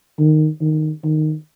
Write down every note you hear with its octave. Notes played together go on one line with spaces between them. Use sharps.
D#3
D#3
D#3